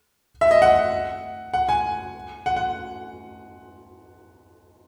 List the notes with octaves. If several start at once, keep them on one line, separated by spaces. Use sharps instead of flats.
E5
D#5
F#5
F#5
G#5
F#5
F#5